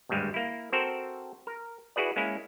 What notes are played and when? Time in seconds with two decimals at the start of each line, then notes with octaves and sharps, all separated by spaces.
0.09 G#1 D2 G2 G3 G#3
0.34 A#3 E4
0.72 C4 F#4 A4 A#4 C5
1.47 A#4
1.96 E4 F#4 G#4 B4 D5
2.16 G#3 A#3 C#4 E4